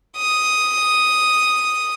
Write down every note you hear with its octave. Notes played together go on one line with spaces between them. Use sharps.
D#6